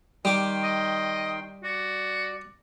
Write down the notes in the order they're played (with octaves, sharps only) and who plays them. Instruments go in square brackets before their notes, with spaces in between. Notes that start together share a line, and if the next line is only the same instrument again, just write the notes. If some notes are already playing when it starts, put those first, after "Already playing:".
[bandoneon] D#3 G5 C6 [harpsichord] G3 D6
[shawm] D#5
[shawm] F#4 [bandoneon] D5